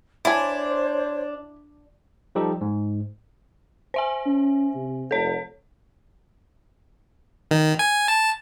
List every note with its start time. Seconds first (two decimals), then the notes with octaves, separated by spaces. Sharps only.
0.25 D4 E4 C5 C#5 G#5
2.35 F3 G3 D#4 G4 A4
2.61 G#2
3.94 C5 E5 G#5
4.26 C#4
4.75 C3
5.11 F1 A4 C#5
7.51 D#3
7.79 G#5
8.08 A5